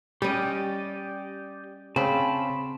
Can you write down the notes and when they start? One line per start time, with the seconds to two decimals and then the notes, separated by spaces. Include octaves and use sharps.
0.22 G3 C#4 G4 D5 D#5
1.96 C#3 C4 A5 B5